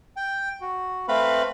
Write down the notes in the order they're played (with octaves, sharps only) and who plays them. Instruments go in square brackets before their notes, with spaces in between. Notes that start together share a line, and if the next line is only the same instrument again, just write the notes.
[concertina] G5
F#4
A3 C4 B4 F5 B5